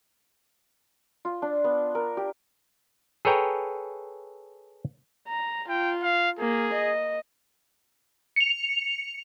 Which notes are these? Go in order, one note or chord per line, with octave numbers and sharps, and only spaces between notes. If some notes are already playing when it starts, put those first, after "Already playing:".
F4
D4
B3
A#4
G4
G#4 A4 B4 C#5 G5 A#5
A#5
F4 G5
F5
A#3 G#4
D#5
C#7 F7